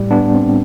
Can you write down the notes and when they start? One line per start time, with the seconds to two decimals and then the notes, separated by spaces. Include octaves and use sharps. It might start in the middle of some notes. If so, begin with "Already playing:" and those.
Already playing: A2 G3
0.11 B3 D4
0.34 C4